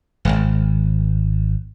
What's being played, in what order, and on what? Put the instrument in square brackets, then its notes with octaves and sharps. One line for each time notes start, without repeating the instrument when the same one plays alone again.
[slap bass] D#1 G#1